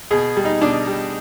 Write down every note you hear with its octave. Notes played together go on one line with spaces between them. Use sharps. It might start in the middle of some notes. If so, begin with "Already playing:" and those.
B2 G#4
G3
D#4
B2 D4
G3